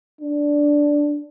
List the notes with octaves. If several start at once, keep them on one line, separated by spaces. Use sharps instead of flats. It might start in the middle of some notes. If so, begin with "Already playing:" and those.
D4